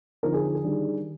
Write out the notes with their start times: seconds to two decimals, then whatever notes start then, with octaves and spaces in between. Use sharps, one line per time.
0.23 D3 F3 C4 D#4 A#4
0.34 G#4
0.55 G#4
0.64 D#3 G3 D4